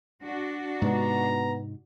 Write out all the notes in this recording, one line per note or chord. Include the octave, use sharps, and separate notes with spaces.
D4 F#4
G#2 C3 G#3 B3 A#5